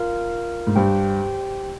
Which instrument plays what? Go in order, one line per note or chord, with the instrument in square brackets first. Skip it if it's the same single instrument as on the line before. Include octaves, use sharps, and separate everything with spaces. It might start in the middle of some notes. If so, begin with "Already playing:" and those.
Already playing: [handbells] F4 A#4 F5
[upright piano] G#2
[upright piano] G2 [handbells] G4 C5 G5